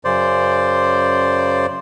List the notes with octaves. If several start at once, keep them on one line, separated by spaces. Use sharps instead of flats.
F#2 C#3 C5 D5